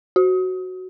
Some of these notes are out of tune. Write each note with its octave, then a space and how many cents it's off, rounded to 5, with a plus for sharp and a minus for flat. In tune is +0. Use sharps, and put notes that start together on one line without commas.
F#4 +5